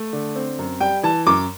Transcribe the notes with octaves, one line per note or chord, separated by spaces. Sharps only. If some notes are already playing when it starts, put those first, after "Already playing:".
Already playing: A3
D3
C4
F#2
G3 G5
E3 A5
F#2 D6